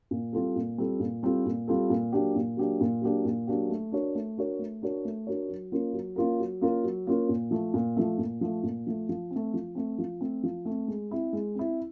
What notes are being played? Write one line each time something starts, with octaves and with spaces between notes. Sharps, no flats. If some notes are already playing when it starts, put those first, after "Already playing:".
A#2
G3 C4 F4 A4
A#2
G3 C4 F4 A4
A#2
G3 C4 F4 A4
A#2
G3 C4 F4 A4
A#2
F#3 A#3 D4 G4
A#2
F#3 A#3 D4 G4
A#2
F#3 A#3 D4 G4
A#2
F#3 A#3 D4 G4
A3
D4 F#4 A#4 C#5
A3
D4 F#4 A#4 C#5
A3
D4 F#4 A#4 C#5
A3
D4 F#4 A#4 C#5
F#3
A#3 C#4 F4 A#4
F#3
A#3 C#4 F4 A#4
F#3
A#3 C#4 F4 A#4
F#3
A#3 C#4 F4 A#4
A#2
F3 A3
A#2
F3 A3
A#2
F3 A3
A#2
F3 A3
F3
C4
A3
F3
A3 C4
F3
A3 C4
F3
A3 C4
G#3
C4 E4
G#3
C4 E4